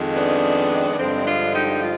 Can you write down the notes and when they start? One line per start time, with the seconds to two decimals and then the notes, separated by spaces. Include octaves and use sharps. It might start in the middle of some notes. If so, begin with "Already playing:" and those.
Already playing: F2 D#3 G#3
0.15 B3 D4
0.92 D4
0.99 G2 D3 F3 G#3 C4
1.26 D4 F4
1.55 D#4 G4
1.81 F4